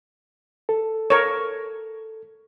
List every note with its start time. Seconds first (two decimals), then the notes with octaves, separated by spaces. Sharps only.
0.69 A4
1.10 A#4 C#5